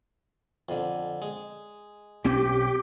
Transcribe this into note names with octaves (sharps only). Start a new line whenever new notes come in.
F2 D3
G#3
B1 C4 C#4 G4